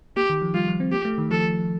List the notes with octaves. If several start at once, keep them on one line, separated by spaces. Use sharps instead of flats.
A#3 G4
D#3
F3
G3 F4
F3
C4
A#3 G4
A3
D#3
F3 A4